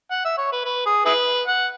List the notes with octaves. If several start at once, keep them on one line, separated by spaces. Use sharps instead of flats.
F#5
E5
C#5
B4
B4
G#4
E4 G#4 B4
F#5